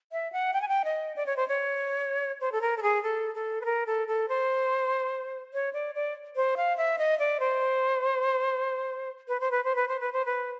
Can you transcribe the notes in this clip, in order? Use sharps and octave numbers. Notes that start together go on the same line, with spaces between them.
E5
F#5
G5
G#5
G5
D#5
D5
C#5
C5
C#5
C5
A4
A#4
A4
G#4
A4
A4
B4
A#4
A4
A4
C5
C#5
D5
D5
C5
F5
E5
D#5
D5
C5
B4
C5
B4
C5
B4
C5
B4
C5
B4